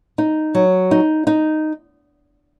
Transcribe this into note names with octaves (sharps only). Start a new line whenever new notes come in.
D#4
F#3
D#4
D#4